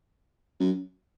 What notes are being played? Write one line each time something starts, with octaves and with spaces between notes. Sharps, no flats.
F#2